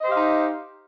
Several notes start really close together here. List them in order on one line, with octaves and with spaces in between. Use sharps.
D#5 C5 G4 F5 D#4